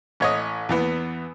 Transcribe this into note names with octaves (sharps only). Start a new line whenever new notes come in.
A1 C#5 D#5
E2 E3 B3